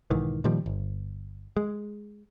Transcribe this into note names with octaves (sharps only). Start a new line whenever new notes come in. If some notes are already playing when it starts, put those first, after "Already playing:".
B1 G#2 D#3 E3
A#2 D#3 F3 G3
G1
G#3